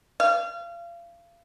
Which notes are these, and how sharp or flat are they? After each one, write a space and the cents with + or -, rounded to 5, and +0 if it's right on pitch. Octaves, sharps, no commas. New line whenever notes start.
F5 -30